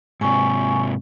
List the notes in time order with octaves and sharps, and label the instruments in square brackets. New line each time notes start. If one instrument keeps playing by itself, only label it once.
[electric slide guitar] G#2 C3 [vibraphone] G#5 C#6